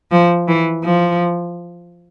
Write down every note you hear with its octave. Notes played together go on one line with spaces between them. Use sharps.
F3
E3
F3